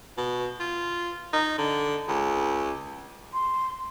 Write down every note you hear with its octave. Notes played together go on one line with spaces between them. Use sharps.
B2
F4
D#4
D3
C#2
C6